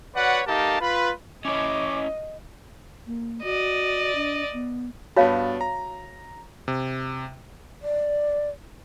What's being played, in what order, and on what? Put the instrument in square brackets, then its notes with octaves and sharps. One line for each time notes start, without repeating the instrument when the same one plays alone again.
[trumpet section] F#4 B4 C#5 D5 F#5
A3 D#4 G4 A#4 F5 A5
F4 B4
[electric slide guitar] C#4 E4 C#5 [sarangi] D#5 [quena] D6
[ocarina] A#3
[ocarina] F#4 [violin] D5 D#5
[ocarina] D4
B3
[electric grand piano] G2 B3 A5 [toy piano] F#4 C#5 F5
[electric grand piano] A#5
C3
[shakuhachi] D5